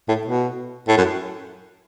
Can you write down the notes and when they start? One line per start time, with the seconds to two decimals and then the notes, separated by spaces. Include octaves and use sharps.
0.09 A2
0.27 B2
0.88 A2
0.97 F#2